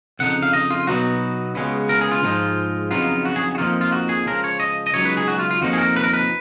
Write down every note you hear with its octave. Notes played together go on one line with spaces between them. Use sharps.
F2 C#3 D#4 F#5
F5
D#5
F4
B2 F#3 B3 D#4 F#4
C#2 C#3 G#3 B3
A#4
G#4
F4
G#2 F3 G#3 D#4
F2 C#3 F#3 B3 D#4 F4
F#4
G#4
F#4
F2 F3 A#3 D#4 F4
F4
F#4
G#4
C#2 C#3 F3 A#4
C#5
D#5
D#5
C#2 C#3 F#3 B3 D#4 C#5
B4
G#4
F#4
F4
F4
F2 F3 A#3 D#4 F#4
G#4
A#4
B4
A#4
B4